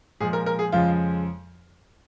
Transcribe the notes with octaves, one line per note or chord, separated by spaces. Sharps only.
A#2 F3 G#3 G#4
A#4
A#4
G#4
F2 C#3 F3 G#3 F4